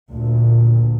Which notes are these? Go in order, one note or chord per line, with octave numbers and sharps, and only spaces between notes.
D2 A#2